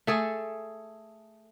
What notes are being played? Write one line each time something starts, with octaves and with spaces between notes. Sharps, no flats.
A3 G#4 A4